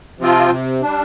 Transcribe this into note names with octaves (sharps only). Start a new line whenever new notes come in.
C3 F3 C4 F4
C3
G3 D4